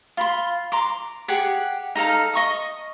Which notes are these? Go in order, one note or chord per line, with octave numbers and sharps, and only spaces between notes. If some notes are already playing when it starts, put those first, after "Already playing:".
F4 B5 C6
A#5 C6 D6
G4 G#4 F#5
D#4 A4 F5 A#5
D#5 C#6 D#6